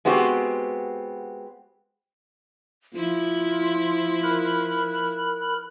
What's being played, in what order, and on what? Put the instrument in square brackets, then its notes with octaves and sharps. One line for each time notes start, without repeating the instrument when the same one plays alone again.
[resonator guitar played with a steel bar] G#3 B3 C4 F#4 G4
[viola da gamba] F3 E4 [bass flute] F4
[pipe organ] A#4 B5 F#6